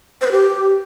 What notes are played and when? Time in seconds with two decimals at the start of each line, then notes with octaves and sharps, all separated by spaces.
0.21 C5
0.26 B4
0.31 G4